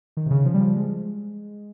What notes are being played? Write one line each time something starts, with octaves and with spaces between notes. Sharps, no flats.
D#3
C3
C#3
F3
G3
F3
G#3